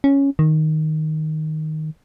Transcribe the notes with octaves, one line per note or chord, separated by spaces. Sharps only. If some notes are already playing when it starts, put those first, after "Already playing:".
C#4
D#3